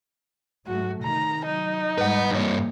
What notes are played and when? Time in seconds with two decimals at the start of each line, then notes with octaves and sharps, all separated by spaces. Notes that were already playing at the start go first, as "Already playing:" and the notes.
0.67 G#2 F#3 A3 F#4
1.03 C3 D#3 A#5
1.46 F#3 D#4
1.98 G#2 G3 G#3 B4 F#5
2.31 G2 E3 A#3 C#5